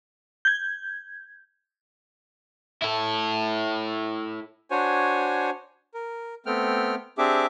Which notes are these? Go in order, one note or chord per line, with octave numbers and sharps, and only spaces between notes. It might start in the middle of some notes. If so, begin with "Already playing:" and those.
G6 G#6
E4 A4
D4 F#4 C5 C#5 G#5
A#4
A3 B3 C4 G5 F6
C4 D4 G4 G#4 E5 D6